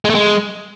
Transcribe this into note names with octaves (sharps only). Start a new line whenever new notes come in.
G#3
A3
G#3